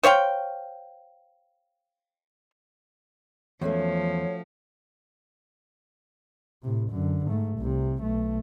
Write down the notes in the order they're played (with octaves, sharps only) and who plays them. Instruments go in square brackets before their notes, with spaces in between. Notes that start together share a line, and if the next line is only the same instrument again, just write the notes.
[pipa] C5 C#5 F5 G5
[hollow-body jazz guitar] E2 [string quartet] F3 [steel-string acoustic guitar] A3 C#4 F#4 [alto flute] C#5
[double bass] A2 C3
F#2 D3
G#2 A3
C2 C3
B1 A3